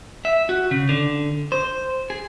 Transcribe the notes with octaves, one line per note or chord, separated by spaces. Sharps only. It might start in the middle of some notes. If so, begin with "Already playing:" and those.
E5
F#4
C#3
D3
C5
G#4